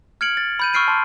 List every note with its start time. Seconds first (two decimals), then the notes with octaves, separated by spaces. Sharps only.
0.21 F6 G#6 C#7 D7 F#7
0.37 A6
0.59 B5 G6 D#7
0.73 C#6 E6 F6 C7 D7 D#7
0.88 A5 C6